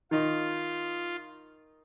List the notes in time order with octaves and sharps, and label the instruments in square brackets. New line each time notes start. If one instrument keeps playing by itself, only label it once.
[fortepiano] D#3 D#4 [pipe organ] F4